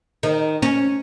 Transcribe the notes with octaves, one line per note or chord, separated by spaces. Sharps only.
D#3
C#4